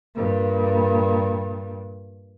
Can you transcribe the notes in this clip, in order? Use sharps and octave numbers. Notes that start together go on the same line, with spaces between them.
G2 A#2